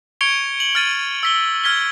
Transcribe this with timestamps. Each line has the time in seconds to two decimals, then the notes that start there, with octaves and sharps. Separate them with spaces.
0.21 C#6 G#6 C#7 D7 F7 G7
0.60 F#7
0.75 F6 A6 D#7
1.23 E6 B6 G7
1.64 F6 G#6 B6 G7